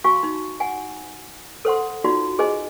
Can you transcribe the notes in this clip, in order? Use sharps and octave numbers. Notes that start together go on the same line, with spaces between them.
F#4 F5 G#5 C#6
D#4
F#5 G#5
A4 C5 F#5 C6
D#4 F4 F#4 D5
G#4 C5 D#5 G#5